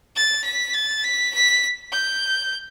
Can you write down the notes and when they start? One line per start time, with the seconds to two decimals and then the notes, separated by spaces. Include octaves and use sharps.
0.16 A6
0.44 B6
0.74 A6
1.04 B6
1.34 B6
1.92 G6